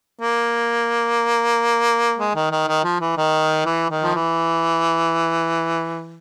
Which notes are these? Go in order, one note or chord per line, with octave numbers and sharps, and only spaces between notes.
A#3
G#3
D#3
D#3
D#3
F3
E3
D#3
E3
D#3
F3
E3